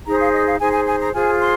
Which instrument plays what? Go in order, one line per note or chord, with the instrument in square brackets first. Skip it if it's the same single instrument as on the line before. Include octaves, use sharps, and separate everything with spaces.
[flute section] D#4 G#4 C5 A#5
F5
D#5
F5
D#4 G#4 C5 G#5
G#5
G#5
A#5
F4 G#4 C5 G#5
C6